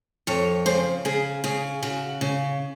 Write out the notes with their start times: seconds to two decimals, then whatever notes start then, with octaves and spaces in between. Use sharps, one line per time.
0.27 F2 C#5
0.66 C#3 C5
1.05 C#3 G#4
1.44 C#3 G#4
1.83 C#3 F#4
2.21 C#3